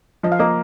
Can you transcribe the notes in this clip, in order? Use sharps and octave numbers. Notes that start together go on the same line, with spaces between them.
F3 D#5
F5
A#3 D#5